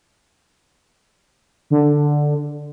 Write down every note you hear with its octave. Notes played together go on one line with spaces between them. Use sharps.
D3